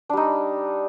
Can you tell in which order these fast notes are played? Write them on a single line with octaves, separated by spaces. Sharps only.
D4 G3 D#4